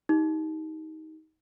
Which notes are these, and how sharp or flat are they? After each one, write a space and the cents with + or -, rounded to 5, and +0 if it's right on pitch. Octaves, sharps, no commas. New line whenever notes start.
D#4 +20 G4 +0